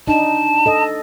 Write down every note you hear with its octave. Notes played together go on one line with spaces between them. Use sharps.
D4 D#4 A5
A4 D#5